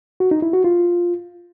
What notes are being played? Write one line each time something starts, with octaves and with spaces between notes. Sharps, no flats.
F#4
D#4
E4
F#4
F4